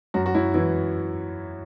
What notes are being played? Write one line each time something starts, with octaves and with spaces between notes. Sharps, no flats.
F#2 F#4
F#4
F#2 E4
E3 E4